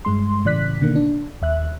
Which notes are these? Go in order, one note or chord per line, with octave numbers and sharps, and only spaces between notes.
G2 G#3 C6
A2 C#3 E3 D5 F#6 B6
B2 D3 D#3 A#3
D4
D#2 E5 F#6